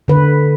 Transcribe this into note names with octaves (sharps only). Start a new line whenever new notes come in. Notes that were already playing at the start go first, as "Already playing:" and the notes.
D3 B4